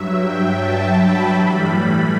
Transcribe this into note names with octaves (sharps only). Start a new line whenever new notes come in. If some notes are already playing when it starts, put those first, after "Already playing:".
Already playing: G2 F#3 E5
G5
A5
B5
A2 E3 G3